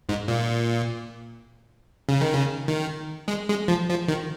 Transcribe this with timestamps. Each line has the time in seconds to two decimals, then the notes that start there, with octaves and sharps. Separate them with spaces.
0.09 G#2
0.28 A#2
2.09 C#3
2.21 D#3
2.33 C#3
2.68 D#3
3.28 G#3
3.49 G#3
3.68 F3
3.89 F3
4.08 D#3